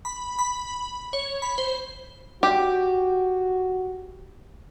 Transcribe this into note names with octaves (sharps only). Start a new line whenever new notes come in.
B5
B5
C#5
B5
C5
F#4 G4